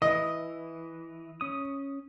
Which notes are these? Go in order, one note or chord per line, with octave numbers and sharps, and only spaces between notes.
E3 D#5
C#4 D#6